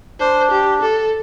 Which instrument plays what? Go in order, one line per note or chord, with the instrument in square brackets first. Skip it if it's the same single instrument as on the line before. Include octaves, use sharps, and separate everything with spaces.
[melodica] D4 [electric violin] C5
[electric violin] G4
A4